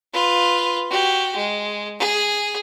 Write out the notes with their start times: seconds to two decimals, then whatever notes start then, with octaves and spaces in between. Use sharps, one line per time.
0.13 F4 B4
0.90 F#4 G4
1.36 G#3
1.99 G#4